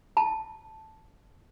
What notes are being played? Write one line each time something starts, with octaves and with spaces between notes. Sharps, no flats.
A5